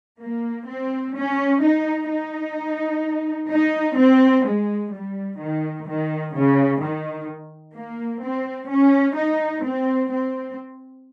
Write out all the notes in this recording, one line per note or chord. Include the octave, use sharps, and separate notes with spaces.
A#3
C4
C#4
D#4
D#4
D#4
C4
G#3
G3
D#3
D#3
C#3
D#3
A#3
C4
C#4
D#4
C4
C4